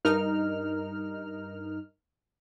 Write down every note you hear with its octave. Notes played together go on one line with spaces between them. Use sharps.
G2 D#4 A#4 F6